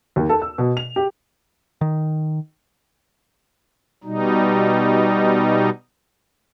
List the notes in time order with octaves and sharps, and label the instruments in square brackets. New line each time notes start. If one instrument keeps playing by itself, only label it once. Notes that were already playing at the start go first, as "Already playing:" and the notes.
[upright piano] D#2
A4
E6
B2
F7
G4
[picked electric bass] D#3
[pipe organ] B2 G3 D#4